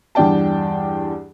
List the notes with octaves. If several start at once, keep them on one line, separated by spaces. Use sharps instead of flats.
E2 G2 D4 D5 G5 A5